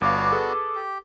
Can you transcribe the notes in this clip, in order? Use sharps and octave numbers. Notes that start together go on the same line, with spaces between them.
G1 B3 D4 F#4 F5 D6
G#4 A4 B4
G4